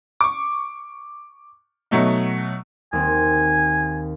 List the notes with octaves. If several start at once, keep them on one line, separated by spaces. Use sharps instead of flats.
C#6 D6
B2 F#3 A3 D#4
D#2 D#3 C4 G#5